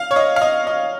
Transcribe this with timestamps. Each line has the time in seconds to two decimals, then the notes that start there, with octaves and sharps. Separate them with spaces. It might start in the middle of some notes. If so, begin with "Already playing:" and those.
Already playing: F5
0.11 C#5
0.16 D#5
0.36 F5
0.42 D#5
0.67 D#5